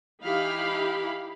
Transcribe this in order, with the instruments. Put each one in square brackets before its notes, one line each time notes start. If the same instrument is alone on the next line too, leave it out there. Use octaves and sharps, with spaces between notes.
[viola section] E3 D#4 E4 G4 F5 B5